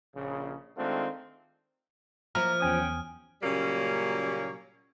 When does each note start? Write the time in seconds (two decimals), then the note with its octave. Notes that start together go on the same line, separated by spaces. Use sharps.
0.15 A#1 C#3
0.77 D#3 G#3 A3 C4 D4 F4
2.35 F3 A#3 E4 A#5 F6
2.60 E2 C#4 G5 G#5 D#6
3.42 A#2 C#3 F#3 G3 A#3 C#4